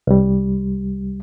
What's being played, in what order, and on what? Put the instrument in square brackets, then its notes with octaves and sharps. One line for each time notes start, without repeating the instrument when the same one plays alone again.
[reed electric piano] C2 G3